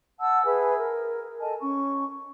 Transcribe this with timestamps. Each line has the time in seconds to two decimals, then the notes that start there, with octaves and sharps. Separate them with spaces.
0.20 F#5 A5 E6
0.45 G#4 B4 E5 G#5
0.78 A#4
1.40 A4 D#5 G#5 A5
1.61 C#4 C#6